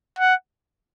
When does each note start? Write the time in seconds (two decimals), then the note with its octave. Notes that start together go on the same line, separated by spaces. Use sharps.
0.19 F#5